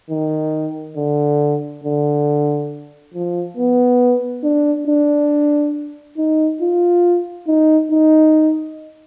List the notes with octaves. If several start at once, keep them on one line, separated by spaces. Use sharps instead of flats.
D#3
D3
D3
F3
B3
D4
D4
D#4
F4
D#4
D#4